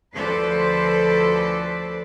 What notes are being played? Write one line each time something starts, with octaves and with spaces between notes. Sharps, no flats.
D2 F3 A4 B4 C5 D5